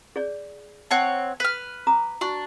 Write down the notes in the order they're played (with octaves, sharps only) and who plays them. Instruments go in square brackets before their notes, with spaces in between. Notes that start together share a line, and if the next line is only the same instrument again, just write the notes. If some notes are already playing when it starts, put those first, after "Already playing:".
[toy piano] G#4 C#5 D5
[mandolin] C4 C#5 F#5 [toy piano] A5
[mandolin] B4 F6
[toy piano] A#5 D6 D#6
[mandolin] D4 [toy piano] F#4 C#6